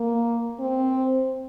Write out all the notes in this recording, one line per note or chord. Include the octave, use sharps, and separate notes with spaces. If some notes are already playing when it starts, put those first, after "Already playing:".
Already playing: A#3
C4